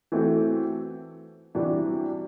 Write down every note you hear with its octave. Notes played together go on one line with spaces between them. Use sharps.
E3 A3 C4 F#4
C3 E3 G3 D4 F#4